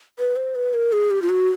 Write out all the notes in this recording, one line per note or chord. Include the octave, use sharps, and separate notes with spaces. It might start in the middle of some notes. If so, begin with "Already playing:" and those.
B4
C5
B4
A#4
G#4
G4
F4
F#4